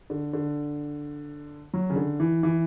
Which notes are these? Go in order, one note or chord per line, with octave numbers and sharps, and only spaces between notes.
D3
D3
F#3
C#3
D3
E3
E3